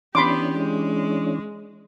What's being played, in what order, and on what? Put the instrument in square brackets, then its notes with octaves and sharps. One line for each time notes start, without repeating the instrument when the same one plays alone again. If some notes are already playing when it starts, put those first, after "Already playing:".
[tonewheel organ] E3 C#4 D4 [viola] B3 G4 [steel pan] B5 C6 D6
[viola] G#3